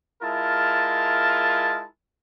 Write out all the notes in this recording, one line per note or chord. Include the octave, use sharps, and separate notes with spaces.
G#3 E4 F4 A#4 A5